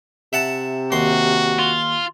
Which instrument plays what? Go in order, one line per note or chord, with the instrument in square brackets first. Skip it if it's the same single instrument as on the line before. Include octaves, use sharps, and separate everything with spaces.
[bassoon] C3 [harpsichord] E5 F#5 A5
[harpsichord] D#2 C6 [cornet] F#4
[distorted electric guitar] F4